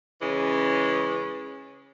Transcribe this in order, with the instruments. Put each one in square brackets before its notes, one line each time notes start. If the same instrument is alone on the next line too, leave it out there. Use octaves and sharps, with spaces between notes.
[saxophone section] C#3 E3 G#3 C#4